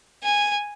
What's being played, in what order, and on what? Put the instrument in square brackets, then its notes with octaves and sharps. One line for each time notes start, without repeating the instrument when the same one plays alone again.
[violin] G#5